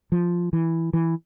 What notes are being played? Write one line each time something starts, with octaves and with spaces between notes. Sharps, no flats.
F3
E3
E3